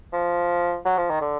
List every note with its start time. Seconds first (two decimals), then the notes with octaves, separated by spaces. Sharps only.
0.13 F3
0.85 F#3
0.98 F3
1.10 D#3
1.21 D3